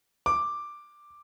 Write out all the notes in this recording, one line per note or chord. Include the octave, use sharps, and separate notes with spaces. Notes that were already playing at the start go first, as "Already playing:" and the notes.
D6